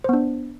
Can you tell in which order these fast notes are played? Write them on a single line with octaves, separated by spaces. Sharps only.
C5 B3 D4